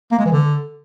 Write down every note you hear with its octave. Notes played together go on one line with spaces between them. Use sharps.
A#3
G#3
E3
D3